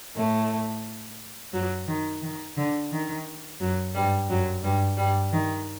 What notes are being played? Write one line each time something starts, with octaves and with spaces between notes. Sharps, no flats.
A2 A3
F#2 F#3
D#3
D#3
D3
D#3
F#2 F#3
G2 G3
F#2 F#3
G2 G3
G2 G3
D#3